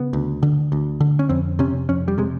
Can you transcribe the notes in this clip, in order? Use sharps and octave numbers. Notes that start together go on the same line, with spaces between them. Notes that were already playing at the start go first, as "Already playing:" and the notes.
Already playing: C#3 B3
D2
D3
D2
D3
C#4
F2 C4
C3 C#4
F2 C#4
G3
C3 G#3